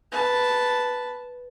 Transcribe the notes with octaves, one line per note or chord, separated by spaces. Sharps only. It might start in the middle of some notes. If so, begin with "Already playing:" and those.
B4 A5